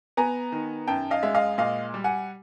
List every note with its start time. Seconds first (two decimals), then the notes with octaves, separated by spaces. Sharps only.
0.17 B3 G#5 A#5
0.52 D#3
0.88 F#2 G5 A5
1.11 D#5 F5
1.23 G#3 E5
1.35 D#5 F5
1.58 A#2 D#5 F5
1.94 G3
2.04 F#5 G#5